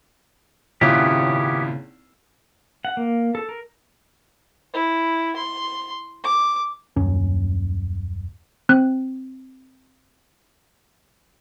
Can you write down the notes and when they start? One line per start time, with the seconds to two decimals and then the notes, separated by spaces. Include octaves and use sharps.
0.81 G#1 A#2 C#3 B3 C#4 E4 F4 G4
2.85 F#5
2.97 A#3
3.35 A4
3.49 A#4
4.73 E4
5.36 C6
6.24 D6
6.96 D#1 F#2 C#4
8.69 C4 F#6